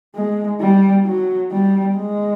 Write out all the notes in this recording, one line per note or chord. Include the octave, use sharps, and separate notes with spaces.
G#3
G3
F#3
G3
G#3